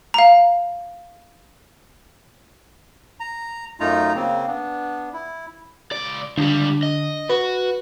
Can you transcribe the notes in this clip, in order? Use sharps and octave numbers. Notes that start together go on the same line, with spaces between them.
F5 A#5
A#5
F#2 A3 D#4 F4 A#5
C#3 A#3 C4
B3 D4
E4
C#2 D5
C#2 D3 G3 D4
D#5
F#4 B4